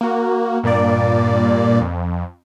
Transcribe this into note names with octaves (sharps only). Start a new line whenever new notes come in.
A#3 F#4
G2 A#2 A#3 D5
F2